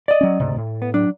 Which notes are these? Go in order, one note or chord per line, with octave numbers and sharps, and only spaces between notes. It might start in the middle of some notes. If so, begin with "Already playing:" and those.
D5 D#5
F#3 C#4
D2 G#2 C3
A2
B3
F#3 D4